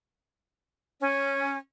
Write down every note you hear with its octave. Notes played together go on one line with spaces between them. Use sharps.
C#4